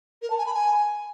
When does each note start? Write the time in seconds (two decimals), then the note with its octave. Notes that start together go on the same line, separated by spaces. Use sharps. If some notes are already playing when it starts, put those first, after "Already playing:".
0.22 A#4
0.30 A5
0.38 G#5
0.46 B5
0.54 G#5